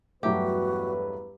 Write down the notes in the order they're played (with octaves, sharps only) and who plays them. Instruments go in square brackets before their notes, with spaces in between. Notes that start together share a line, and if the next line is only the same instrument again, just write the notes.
[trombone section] E2 B4 [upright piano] G2 F#3 A3 [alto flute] F#4 [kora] G4